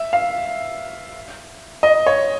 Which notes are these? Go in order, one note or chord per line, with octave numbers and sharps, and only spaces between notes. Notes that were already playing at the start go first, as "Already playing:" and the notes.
Already playing: E5
F5
D#5
C#5